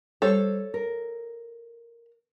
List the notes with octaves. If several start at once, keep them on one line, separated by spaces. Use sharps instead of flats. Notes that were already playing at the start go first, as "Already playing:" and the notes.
G3 A4 C5 C#5
A#4